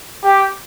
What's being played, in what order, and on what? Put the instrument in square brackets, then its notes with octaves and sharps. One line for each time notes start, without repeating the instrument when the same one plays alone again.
[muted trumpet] G4